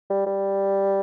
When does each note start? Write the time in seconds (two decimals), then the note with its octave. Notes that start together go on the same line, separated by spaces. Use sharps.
0.10 G3
0.26 G3